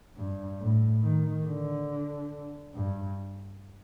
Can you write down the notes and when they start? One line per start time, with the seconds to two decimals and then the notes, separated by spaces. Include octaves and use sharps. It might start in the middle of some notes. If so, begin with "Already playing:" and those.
0.17 G2
0.60 A2
1.02 D#3
1.46 D3
2.74 G2